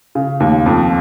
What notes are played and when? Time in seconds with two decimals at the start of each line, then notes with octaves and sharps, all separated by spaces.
0.15 C#3
0.40 D#2
0.66 F2